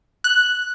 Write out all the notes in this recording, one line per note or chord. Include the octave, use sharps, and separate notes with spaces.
F#6